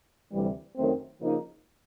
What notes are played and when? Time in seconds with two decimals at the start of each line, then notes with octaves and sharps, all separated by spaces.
0.32 D2 C3 E3 G3
0.76 F#2 D#3 F#3 A3 C4
1.20 C#3 F3 A#3 D#4